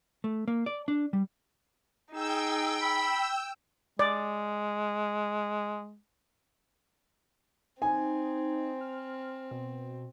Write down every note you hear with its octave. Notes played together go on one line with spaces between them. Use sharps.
A3
A#3
D5
D4
G3
D#4 G#4 G5 E6
B5
G#3 D5
C4 D#4 G#5
F6
B2